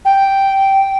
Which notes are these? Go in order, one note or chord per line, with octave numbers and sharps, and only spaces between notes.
G5